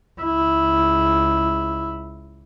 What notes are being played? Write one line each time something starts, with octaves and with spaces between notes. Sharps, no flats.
C#2 E4